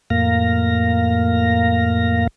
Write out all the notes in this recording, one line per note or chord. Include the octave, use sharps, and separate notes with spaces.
F2 A2 A#3 F5 A#6